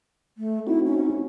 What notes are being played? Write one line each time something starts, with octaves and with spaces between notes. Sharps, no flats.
A3
C4 D#4 E4 F#4
C#4